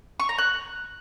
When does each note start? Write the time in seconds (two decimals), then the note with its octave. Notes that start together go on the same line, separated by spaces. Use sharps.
0.20 C#6
0.29 A#5
0.38 F#6